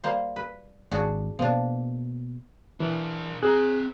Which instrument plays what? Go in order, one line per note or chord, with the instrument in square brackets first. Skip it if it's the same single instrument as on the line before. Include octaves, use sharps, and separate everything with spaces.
[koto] G3 A#3 C5
B4
[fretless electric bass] G#1 [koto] D4 F#4 G#4
[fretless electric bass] B2 A#3 [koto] F3 D4
[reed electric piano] E3 [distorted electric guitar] D4 A#4
[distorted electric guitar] C4 A#5 [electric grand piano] G#4 [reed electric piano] F#6